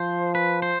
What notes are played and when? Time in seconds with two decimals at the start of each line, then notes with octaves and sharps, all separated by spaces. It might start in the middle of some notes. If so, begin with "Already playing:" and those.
Already playing: F3 C5
0.35 B4
0.62 C5